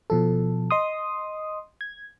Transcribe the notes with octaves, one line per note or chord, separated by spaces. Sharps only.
B2 F3 A4
D#5 C6 D#6
G#6